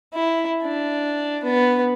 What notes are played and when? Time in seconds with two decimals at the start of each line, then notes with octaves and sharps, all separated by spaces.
0.14 E4
0.63 D4
1.44 B3